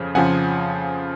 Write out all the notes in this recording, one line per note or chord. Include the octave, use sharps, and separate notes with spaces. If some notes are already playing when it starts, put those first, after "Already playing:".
Already playing: F2 C#3 F3
F2 C#3 F3 F#5 G#5